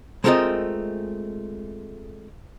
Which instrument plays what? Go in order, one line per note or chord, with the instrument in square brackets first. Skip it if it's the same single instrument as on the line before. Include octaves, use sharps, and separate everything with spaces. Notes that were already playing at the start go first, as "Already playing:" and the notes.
[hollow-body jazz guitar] G#3 A3 C4 F4 A#4 D#5